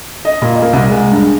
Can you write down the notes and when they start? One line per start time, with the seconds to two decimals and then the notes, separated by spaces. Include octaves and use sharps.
0.25 D#5
0.42 A#2
0.62 A#3
0.73 C2
0.90 G#3
1.12 G2